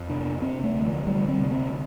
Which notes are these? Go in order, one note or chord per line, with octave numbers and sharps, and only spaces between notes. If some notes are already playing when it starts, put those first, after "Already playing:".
Already playing: F2
C3 D4
C3 C4
A3
D2
F3
D2 G3
C4
C3
C4